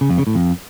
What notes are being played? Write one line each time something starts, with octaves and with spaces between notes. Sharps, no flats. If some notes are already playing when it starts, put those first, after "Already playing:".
C#3
F2
C#3
A2
F2